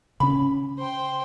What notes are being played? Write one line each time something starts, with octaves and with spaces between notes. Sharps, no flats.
C#3 C#4 B5
C5 G5